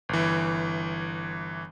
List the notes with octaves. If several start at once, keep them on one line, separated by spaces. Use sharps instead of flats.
G1 E3